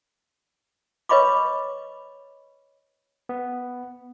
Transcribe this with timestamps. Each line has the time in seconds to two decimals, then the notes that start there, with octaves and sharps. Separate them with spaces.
1.09 B4 C#5 D#5 B5 C#6 D6
3.29 B3